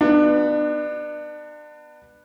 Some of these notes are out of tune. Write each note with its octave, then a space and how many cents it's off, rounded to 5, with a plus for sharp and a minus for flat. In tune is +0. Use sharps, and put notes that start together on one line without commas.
B3 +0 D4 +35